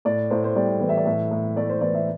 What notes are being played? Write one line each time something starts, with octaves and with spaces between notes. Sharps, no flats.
A2 D5
A2 C5
C5
G3 D5
E3
E5
D5
A2 E5
A2
A3 D5
C5
E3 D5
E5